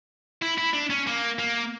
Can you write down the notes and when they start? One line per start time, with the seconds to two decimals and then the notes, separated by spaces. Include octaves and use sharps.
0.42 E4
0.58 E4
0.74 D4
0.90 C#4
1.07 A#3
1.39 A#3